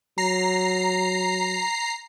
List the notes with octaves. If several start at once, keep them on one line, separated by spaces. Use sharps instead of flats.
F#3 A#5 C7